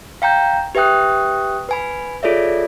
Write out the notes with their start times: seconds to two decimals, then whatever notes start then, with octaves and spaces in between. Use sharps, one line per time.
0.22 F5 G5 A#5 G6
0.75 G4 B4 E5 G5 D#6 F#6
1.69 B4 G#5 B5
2.23 F4 G#4 A4 C#5 D5 E5